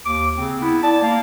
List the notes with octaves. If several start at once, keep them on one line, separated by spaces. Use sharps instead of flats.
D#2 D6
C#3 C4
B3 E4
D5 A5
A#3